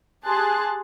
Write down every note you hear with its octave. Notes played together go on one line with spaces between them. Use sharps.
G4 G#4 A5 C6 F#6